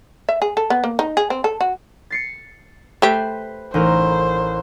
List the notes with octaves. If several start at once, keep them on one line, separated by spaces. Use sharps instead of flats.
E5
G#4
A4
B3
A#3
D#4
G#4
C4
A4
F#4
A6 C7 C#7
A3 G4 B4 C5
A1 D#4 A#4 C5